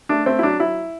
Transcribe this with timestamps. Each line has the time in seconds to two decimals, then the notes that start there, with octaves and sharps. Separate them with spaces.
0.09 A3 D4
0.26 A3 C4
0.39 E4
0.43 F#3 D4
0.59 F#3 E4